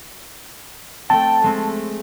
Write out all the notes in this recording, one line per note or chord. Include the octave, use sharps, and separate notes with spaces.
A3 C4 G5 A5
G#3 A3 C4